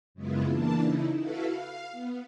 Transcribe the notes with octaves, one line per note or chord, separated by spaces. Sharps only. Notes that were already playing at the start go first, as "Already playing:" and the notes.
F#2 C#3 G#3 B3 E4 F4
E3 A#3 D4 A5
C#3 D#4 E4
E4 F#4 A4 B4 F5
F5
B3